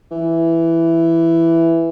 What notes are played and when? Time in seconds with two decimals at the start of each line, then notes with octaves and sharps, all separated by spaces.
0.11 E3